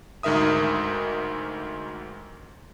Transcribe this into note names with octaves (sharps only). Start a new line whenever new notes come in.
D2 G#2 D#3 A#4 E5 D#6